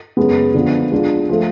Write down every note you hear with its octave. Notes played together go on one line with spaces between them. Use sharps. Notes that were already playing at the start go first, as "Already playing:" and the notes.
F#2 C#3 G#3 B3
D3 F3 B3
G#3 D4 F4
F3 A3 F4 A4